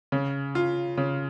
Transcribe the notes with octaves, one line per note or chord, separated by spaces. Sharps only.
C#3
F4
C#3